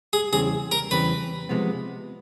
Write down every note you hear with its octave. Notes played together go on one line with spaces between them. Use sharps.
G#4
E2 C#3 E3 G3 C4 G#4
A#4
E2 C#3 E3 G3 C4 B4
C3 F3 G#3 B3